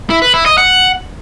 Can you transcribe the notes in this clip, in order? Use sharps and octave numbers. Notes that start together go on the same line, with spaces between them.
E4
B4
E4
D#5
F#5